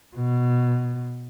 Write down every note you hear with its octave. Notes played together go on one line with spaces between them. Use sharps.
B2